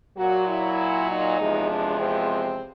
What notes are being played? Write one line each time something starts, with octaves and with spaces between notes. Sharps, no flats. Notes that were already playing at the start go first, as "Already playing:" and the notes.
A#2 F#3 F#4
E4
D#4
E2 C3 F3 G#3
D4
C4